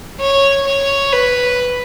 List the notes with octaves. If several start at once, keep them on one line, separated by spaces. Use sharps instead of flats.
C#5
C#5
B4